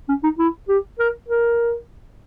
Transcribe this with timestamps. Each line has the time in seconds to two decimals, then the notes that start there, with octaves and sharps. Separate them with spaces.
0.09 C#4
0.23 D#4
0.39 E4
0.69 G4
0.99 A#4
1.29 A#4